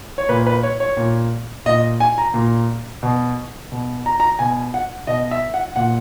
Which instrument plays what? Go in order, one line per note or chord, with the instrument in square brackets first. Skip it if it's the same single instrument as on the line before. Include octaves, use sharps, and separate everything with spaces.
[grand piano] C#5
A#2 B4
B4
C#5
C#5
A#2
A#2 D#5
G#5
A#5
A#2
B2
B2
A#5
A#5
B2 G#5
F#5
B2 D#5
E5
F#5
A#2 F#5